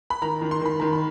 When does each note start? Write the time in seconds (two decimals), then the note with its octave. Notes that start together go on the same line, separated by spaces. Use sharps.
0.10 B5
0.22 D#3 A#5
0.42 D#3
0.51 C6
0.61 D#3 B5
0.80 D#3 A#5
0.93 B5